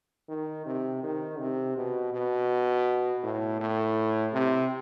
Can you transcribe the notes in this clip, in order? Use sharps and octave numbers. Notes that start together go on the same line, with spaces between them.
D#3
C3
D#3
C3
B2
B2
A2
A2
C3